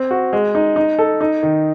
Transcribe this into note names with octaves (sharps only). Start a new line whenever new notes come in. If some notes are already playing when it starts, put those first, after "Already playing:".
Already playing: C4
F#4
G#3
D#4
D#4
A4
D#4
D#3